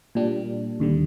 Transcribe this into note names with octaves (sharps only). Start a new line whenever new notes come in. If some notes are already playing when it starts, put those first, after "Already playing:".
A#2 G3 D4
D#2 D3 G3